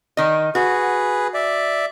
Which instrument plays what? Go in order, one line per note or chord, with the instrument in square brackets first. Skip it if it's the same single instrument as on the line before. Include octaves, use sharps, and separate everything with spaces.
[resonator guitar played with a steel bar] D#3 D#5
[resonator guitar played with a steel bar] F#4 [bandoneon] G#4 B4
[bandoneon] D5 E5